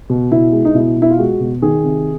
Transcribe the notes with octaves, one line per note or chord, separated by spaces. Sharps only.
B2
B2 E4
G#3
D#4
B2 E4
B2
E4
F4
G#3 F#4
B2
D#3 G#4
C3